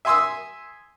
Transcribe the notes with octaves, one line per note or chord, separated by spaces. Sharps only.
E5 G#5 C6 D#6 E6